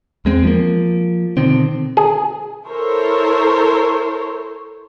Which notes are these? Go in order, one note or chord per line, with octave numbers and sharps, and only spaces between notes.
E2 G#3 C4
F3 A#3
B2 D3 D#3 C4
G#4
E4 A4 A#4 C5 C#5